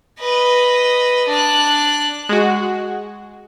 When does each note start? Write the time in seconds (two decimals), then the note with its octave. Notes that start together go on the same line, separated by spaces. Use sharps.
0.19 B4 D#5
1.27 D4 F#6
2.29 G#3 F#4